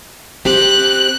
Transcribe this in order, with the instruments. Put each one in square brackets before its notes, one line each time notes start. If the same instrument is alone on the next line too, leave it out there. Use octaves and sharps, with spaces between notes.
[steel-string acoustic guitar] C4 G4 [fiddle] F#6